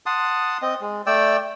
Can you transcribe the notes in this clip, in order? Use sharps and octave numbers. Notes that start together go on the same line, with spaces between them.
F#5 A5 C6 D#6
C4 D#5
G#3
A3 D5 G5 E6